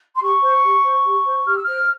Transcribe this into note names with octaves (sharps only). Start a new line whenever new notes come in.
C6
G4 C#6
C5
G4
C5
G4
C5
G4 F6
E6
C5 F6